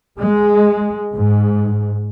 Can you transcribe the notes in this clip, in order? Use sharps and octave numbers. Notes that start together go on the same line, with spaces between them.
G#3
G#2